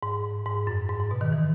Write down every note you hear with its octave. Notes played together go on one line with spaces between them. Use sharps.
G#2
G#2
F#2
G#2
G#2
B2
D#3
E3